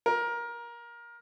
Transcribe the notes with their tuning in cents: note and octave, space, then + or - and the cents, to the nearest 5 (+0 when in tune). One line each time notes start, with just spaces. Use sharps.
A#4 +20